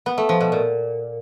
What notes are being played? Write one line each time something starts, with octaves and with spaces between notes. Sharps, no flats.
B3
A3
F3
B2
A#2